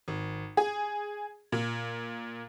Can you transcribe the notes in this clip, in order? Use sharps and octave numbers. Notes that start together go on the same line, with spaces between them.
G#1
G#4
A#2